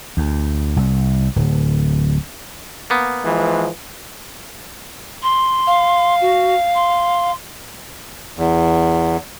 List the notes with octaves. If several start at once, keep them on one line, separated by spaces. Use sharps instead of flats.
D2
C2
D1
A#3 B3
E3 F3 G#3
C6
F5
F#4
C6
E2